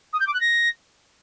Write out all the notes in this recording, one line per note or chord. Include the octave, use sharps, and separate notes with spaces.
D#6
G6
D6
F#6
A#6